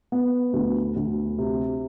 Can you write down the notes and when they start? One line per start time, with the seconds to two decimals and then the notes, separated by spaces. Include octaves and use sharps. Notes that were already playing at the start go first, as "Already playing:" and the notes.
0.12 B3
0.53 D2
0.96 D2
1.38 C3